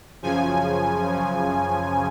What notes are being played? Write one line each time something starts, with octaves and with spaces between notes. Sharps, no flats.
F#2 C#3 F3 G#5
F#2 C#3 F3